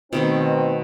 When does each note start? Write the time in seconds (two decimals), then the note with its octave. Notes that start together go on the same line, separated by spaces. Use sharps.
0.13 B2 D#3 A3 B3 C4 D#4